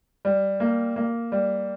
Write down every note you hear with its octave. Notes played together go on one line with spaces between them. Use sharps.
G3
A#3
A#3
G3